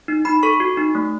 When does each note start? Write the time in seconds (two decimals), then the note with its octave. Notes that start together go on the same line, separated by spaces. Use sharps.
0.08 D#4
0.25 D#4 B5
0.43 A4 C#6
0.60 F#4
0.77 D#4
0.95 A3